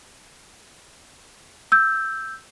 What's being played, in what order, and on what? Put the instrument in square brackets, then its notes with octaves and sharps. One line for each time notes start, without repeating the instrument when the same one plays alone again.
[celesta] E6 G6